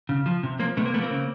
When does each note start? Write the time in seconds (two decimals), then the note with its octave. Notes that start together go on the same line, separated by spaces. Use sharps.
0.09 C#3
0.26 F3
0.43 C3
0.59 F3 A#3 C4
0.77 C3 A3 B3
0.85 A#3
0.94 F3 A3 B3
1.02 A#3 C4
1.11 C#3